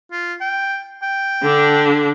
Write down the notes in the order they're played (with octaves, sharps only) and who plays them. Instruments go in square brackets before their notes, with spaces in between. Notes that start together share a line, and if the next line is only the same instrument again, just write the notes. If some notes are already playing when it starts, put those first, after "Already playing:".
[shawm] F4
G5
G5
[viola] D3 D4